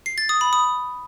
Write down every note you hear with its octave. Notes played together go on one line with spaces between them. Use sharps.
C7
A6
D#6
B5
D#6